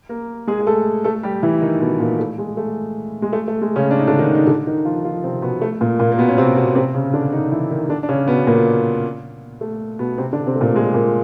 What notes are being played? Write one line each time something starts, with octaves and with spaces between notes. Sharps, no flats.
A#3 A#4
G#3 G#4
G#4
A3 A4
A3 A4
G3 G4
E3 E4
D#3 D#4
B2 B3
A#2 A#3
A3
G#3
A3
G#3
A3
A3
G#3
C#3 C#4
D4
D#4
D3 D4
D#3 D#4
D#4
D3 D4
D#3 D#4
F3 F4
F3 F4
C3 C4
B2 B3
A3
A#2 A#3
A#2 A#3
A#3
B2 B3
C#4
C3 C4
B2 B3
C3 C4
C#3 C#4
D3 D4
D#3 D#4
E3 E4
D#3 D#4
D3 D4
D4
C#3 C#4
B2 B3
A#2 A#3
A3
B2 B3
C3 C4
D3 D4
C3 C4
A3
A#2 A#3
G#3
A#2 A#3